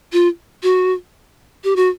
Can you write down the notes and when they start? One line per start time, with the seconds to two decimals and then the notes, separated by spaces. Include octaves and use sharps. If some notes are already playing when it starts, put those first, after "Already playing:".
0.13 F4
0.63 F#4
1.64 G4
1.76 F#4